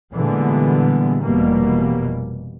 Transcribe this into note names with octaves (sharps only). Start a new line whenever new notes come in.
A#2 D3 E3 G3 G#3 B3
F1 B2 E3 G3 A#3